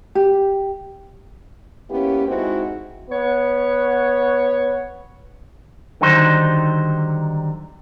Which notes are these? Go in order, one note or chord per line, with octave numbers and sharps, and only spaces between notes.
G4
A#3 B3 C#4 E4 G4
G#3 C4 D#4 E4 F#4
B3 C#5
D3 D#3 F#3 G3 D#4 C5